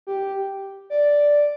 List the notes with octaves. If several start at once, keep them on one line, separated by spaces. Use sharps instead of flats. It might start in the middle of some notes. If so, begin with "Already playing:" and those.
G4
D5